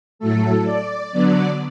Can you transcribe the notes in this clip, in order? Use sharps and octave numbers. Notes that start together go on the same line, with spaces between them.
A2 F#3 A3 A4
D5
D3 F#3 B3